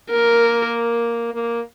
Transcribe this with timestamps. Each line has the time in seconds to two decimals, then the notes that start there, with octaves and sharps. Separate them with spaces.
0.11 A#3 A#4
1.34 A#3